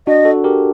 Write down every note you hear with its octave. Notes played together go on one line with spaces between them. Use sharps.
D4 F#4 D#5
F#4 A4
G4 A#4